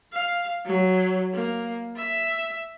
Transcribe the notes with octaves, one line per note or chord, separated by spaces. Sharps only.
F5
F#3
A#3
E5